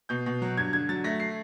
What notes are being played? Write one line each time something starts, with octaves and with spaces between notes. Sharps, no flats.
B2 G6
B2
F#3
G2 G#6
D3 G#6
F#3 A6
A3 A#6
C7